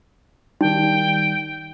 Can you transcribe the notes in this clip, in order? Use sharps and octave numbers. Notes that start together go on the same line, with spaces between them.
D#3 G3 D#4 G5